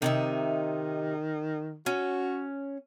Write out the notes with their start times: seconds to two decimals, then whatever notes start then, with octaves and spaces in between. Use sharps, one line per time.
0.02 C3 D#3 D#4 E5
1.86 C#4 F#4